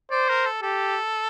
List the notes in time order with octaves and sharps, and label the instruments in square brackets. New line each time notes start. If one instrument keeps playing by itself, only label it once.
[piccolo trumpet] C5 [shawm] D5
[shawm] A#4
A4
[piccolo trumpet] G4 [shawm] A4